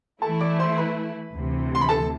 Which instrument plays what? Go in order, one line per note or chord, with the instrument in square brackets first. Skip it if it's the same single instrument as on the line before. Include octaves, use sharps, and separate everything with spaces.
[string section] E3 A3 E4 [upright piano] A4 A5
[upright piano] D5 D6
C5 C6
B4 B5
[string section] D2 C3 E3
[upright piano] C6
B5
A4 A5